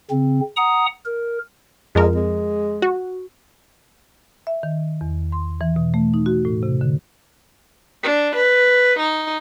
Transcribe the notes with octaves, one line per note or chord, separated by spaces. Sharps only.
C#3 C4
F#5 A#5 D#6
A#4
F2 G#3 A#4
G#3
F#4
E5
D#3
E2
C6
E3
B2
A3
D#4
F#4
A2
C3
D3
D4
B4
D#4